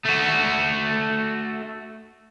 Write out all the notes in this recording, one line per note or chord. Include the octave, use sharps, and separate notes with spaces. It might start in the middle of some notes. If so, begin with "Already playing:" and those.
A3 F#4